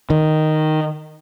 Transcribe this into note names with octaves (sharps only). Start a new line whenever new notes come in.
D#3